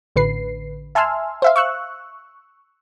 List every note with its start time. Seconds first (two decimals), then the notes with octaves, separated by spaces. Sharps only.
0.16 A1 D3 B4 C7
0.95 E5 G#5 A5 C6 E6 F6
1.42 C5 E5 F5
1.56 C#6 E6 F#6